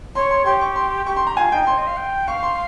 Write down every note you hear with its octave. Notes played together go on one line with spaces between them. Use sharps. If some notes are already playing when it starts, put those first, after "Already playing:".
C#5 C6
C6
G4 C6
C#6
C6
G4 C#6
C6
A#5
F4 G#5
D#4 G5
C#5 C6
D#5
F5
G5
F5 C#6
C6